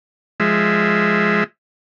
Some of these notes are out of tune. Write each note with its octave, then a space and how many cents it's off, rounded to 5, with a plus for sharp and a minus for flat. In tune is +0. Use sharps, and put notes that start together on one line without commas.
F3 +0 G#3 +0 E5 +5